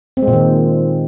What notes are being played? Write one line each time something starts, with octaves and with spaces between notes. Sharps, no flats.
C4
G#3
A#2
D#3